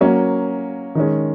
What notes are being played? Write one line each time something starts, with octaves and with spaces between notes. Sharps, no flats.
F#3 A#3 C#4
D#3 G#3 C#4